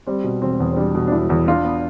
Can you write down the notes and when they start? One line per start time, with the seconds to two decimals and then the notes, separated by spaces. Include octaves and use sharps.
0.07 G3 C4
0.24 B2
0.42 E1 C4
0.60 E2
0.72 C4
0.76 G3 D4
0.95 B2
1.07 D4
1.12 E1 E4
1.30 E2
1.48 D4 F4
1.65 B3